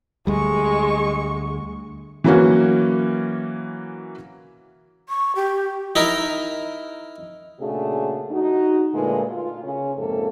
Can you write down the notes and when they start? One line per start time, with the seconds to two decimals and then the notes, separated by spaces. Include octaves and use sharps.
0.27 D2 G3 G#3 C#6
2.24 E3 F#3 A#3 C#4 F#4
5.09 C#6
5.36 G4
5.96 D#4 E4 A#4
7.60 A#2 C#3 A3 D4 F#4 G#4
8.32 D#4 F#4
8.94 A#2 D3 G#3 A3 F4 B4
9.33 F4
9.64 C#3 C#4
9.97 F2 G#2 C3 A#3 C#4 A4